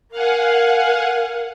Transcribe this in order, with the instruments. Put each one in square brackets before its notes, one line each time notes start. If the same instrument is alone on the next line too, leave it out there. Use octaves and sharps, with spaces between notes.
[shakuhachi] A#4 [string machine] F5 F#5 G#5